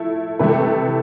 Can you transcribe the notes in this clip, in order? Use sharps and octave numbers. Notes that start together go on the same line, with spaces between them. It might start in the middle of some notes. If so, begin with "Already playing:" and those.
Already playing: F3 A3 E4 A4
C3 E3 A3 B4
A4